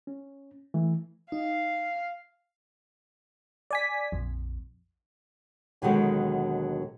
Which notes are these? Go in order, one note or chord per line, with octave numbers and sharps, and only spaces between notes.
C#4
E3 A3
D#4 F5
D5 G#5 B6
A#1 F2
D#2 B2 D3 D#3 F#3 G#3